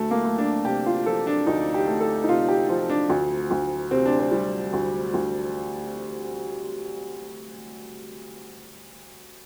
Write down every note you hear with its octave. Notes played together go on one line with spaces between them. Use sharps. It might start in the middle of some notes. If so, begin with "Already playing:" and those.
Already playing: D2 A3
A#3
A3
D4
C3 G4
F4
F3 A4
D4
D2 D#4
G4
A3
A4
D#4
C3 F4
G4
F3 F4
D4
D2
D2
C3 C4
D4
C4
G3
D2
D2